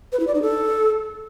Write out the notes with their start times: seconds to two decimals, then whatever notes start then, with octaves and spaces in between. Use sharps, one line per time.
0.12 B4
0.20 E4
0.27 D5
0.35 D#4
0.42 A4